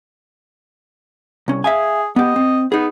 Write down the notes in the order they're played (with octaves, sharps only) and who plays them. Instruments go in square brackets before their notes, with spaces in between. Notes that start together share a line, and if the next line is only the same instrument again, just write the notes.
[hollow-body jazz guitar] C2 C#4
[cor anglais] G#4 [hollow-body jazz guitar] E5 F5 G#5
[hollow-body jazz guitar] B3 G4 [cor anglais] D#5
[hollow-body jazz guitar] C4
[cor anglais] B3 [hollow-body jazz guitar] D#4 G#4